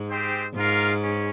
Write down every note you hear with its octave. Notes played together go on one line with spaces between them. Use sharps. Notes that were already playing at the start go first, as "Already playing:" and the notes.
Already playing: G#2
G#3 C4 G4 C5
G#2 F4 A#4 F5
C#4